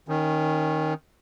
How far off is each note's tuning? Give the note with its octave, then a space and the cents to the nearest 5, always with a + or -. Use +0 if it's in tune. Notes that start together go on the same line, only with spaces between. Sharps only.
D#3 +0 C#4 -25